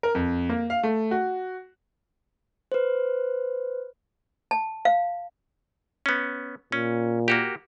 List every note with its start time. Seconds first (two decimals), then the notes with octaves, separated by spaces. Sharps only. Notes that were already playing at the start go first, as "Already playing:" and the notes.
0.03 A#4
0.15 F2
0.49 A#3
0.70 F5
0.83 A3
1.11 F#4
2.72 B4 C5
4.51 A5
4.85 F5
6.06 B3 C#4
6.72 A#2 C#4
7.28 A#3 F#4 G4